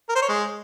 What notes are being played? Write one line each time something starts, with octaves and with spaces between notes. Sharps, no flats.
A#4
C5
C#5
G#3